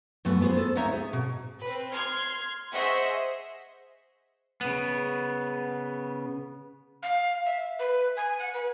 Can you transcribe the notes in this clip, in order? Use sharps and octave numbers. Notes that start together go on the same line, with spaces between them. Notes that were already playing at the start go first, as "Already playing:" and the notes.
F#2 A3 B3
B3 G#4 B4 C5
A4
D2 B3 D#4 C#5 E5 A#5
G#4
B2
C4 B4
C6 F6 G#6
G#4 C5 D#5 E5 F#5 C#6
C#3 B3
F5
E5
B4
G#5
F#5
B4